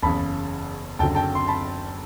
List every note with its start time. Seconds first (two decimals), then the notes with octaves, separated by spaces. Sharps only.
0.02 F#1 E2 C#3 A5 B5
0.99 F#1 F#2 D3 F#3 G5 A5
1.15 G5 A5
1.35 C6
1.48 A5 B5